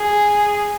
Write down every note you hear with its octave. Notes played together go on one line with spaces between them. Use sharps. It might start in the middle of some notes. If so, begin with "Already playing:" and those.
Already playing: G#4